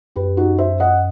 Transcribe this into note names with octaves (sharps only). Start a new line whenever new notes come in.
F#2 G4 B4
D#4 F#4
C5 E5
D#5 F#5